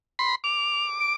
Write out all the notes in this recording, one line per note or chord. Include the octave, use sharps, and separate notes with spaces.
B5 C6
D6 F7
D7